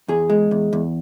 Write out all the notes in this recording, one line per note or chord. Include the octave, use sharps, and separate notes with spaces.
E2 G#4
G#3
E2
E2